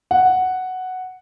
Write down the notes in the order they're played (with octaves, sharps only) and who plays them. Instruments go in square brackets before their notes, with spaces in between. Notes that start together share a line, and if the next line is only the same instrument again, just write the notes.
[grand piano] F#5